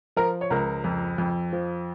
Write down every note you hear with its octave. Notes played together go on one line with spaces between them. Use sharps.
F3 A#4
C#5
C#2 A#4
F2
F2
F3